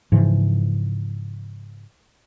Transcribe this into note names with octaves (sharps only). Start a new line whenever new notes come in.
G#2 C#3 E3 F3